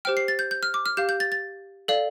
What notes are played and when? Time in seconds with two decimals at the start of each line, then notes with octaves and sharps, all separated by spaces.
0.05 G4 C5 G5 F6
0.17 C7
0.28 A6
0.39 G6
0.51 G6
0.63 F6
0.74 D6
0.86 F6
0.97 G4 F5 G6
1.09 G6
1.20 A6
1.32 A6
1.88 A4 D5 F5